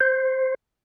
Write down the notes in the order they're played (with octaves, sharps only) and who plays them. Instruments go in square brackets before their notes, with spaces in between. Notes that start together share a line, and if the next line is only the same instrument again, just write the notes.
[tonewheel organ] C5